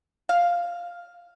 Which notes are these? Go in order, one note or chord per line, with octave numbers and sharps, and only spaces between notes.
F5